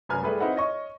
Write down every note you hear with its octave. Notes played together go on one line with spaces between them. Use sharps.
F1 F#2 B4 G#5 F6
G3 A3 E4 G#4 B4
C4 D#4 E4 B4 F#5
C#5 D#5 C#6